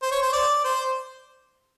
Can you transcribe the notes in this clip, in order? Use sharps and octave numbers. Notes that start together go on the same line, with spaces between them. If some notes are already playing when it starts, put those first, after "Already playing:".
C5
C#5
C5
D5
C5